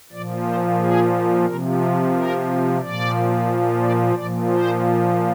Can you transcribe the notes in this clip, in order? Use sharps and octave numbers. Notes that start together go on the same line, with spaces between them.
A#2 F3 D5
C5
G#4
C3 F3 A#4
A#4
A#2 F3 D5
D5
A#2 F3 D5
C5